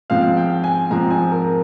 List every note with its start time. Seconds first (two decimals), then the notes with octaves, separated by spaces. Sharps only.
0.10 G#2 F3 C4 F5
0.37 G5
0.64 G#5
0.91 G#2 F3 C4 A#5
1.10 G#5
1.32 A#4